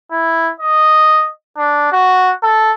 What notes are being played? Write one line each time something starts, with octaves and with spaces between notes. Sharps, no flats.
E4
D#5
D4
F#4
A4